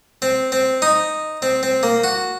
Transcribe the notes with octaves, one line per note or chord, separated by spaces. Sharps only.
C4
C4
D#4
C4
C4
A#3
F#4